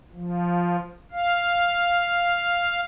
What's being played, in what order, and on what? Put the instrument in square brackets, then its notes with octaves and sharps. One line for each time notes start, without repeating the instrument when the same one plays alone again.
[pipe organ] F3
F5